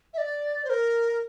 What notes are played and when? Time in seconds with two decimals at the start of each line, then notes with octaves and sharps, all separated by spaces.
0.14 E5
0.18 D5
0.65 C5
0.70 A#4